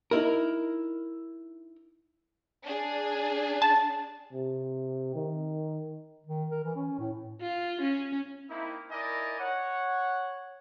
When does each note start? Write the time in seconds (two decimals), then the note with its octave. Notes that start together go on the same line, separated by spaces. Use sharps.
0.11 D#4 E4 A#4
2.64 D4 G#4
3.62 A5
4.33 C3
5.15 D#3
6.27 D#3
6.51 A#4
6.64 E3
6.76 C#4
6.99 A2
7.41 F4
7.81 C#4
8.50 A#3 C4 D#4 E4
8.91 D#4 E4 A#4 D5 D#5 G#5
9.39 C#5 F#5